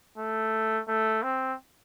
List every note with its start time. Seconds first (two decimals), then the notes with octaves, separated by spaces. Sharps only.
0.18 A3
0.88 A3
1.23 C4